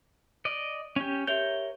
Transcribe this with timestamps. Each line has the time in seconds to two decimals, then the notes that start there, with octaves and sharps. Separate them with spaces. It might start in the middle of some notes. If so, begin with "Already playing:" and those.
0.45 D5 D#5
0.96 C#4 G4
1.27 G4 A#4 C#5 E5 G6 G7